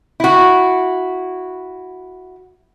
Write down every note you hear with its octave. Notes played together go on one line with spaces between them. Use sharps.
E4 F#4